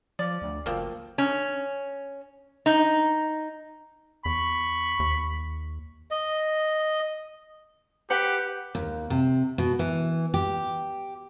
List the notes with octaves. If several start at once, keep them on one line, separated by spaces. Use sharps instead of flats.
F3 D5
D2
F#1 F3 A#3 C4
C#4
D#4
E2 B5 C#6
D#2
D#5
G4 B4 F#5
D#2
C3
B2
E3
G4